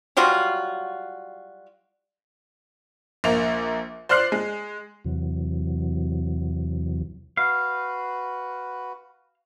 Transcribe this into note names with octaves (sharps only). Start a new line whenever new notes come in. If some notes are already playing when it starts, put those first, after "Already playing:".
F#3 G3 F4 F#4
A#1 A#3 F7
C5 D5 C6 F6 F#6 C7
G#3
E2 C3 E3 F#3
F#4 B4 F5